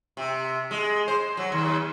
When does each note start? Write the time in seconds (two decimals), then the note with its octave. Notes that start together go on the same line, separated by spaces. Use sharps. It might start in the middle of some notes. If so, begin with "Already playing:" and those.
0.17 C3
0.71 G#3
1.08 C5
1.37 F#3
1.52 D#2